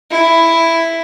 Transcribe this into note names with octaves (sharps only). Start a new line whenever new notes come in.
E4